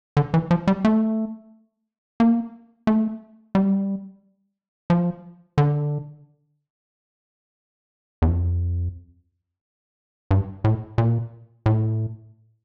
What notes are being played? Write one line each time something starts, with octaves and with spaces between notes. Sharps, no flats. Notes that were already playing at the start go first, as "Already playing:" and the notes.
D3
E3
F3
G3
A3
A#3
A3
G3
F3
D3
E2
F2
G2
A2
A#2
A2